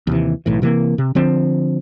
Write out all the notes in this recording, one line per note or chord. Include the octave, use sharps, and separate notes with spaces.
D#2 C3 E3
B1 A2 E3
C3 E3 F3 A#3
C3
D3 F3 C4